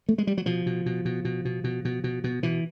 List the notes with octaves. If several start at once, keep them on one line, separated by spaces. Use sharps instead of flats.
A3
G#3
G3
F#3
B2 F3
B2
B2
B2
B2
B2
B2
B2
B2
B2
B2 E3